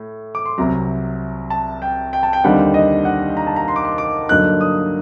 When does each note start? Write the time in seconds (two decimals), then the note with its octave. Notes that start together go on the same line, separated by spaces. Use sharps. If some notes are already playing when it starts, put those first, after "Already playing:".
Already playing: A2
0.35 D6
0.46 C6
0.58 C2 C3 F#3 A#5
1.50 A5
1.82 G5
2.13 G5
2.23 A5
2.33 G5
2.44 D#2 D3 G3 C4 D#4 F#5
2.74 D#5
3.05 F#5
3.37 A#5
3.47 A5
3.56 A#5
3.68 C6
3.76 D6
3.85 C6
3.98 D6
4.29 G2 D3 F#3 A#3 D#4 F#6
4.61 D#6